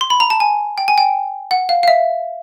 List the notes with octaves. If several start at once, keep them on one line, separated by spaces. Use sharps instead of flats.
C6
B5
A#5
A5
G#5
G5
G#5
G5
F#5
F5
F5
E5